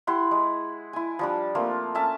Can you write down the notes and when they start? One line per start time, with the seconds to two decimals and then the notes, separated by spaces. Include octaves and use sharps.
0.07 E4 G4 F#5 C6
0.31 G#3
0.93 E4 G#5
1.19 F3 G3 D4
1.55 A3 A#3 C4 F4
1.95 A3 C#4 E5 A5